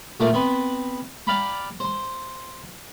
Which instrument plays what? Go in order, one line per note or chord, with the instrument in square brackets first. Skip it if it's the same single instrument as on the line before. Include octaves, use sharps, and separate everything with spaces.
[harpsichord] A#2 A3 A#3 F4 A#4 D5
B3 C4 B4
D5 F5 G5 A#5 B5
C5 C6